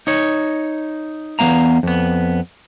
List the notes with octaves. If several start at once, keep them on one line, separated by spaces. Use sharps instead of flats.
D#4 C#5
E2 A3 B3 F5 A#5
F2 B3